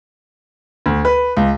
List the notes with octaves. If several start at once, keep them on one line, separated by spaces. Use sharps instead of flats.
D2
B4
C#2